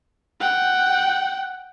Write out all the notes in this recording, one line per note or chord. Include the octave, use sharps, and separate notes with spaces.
F#5 G5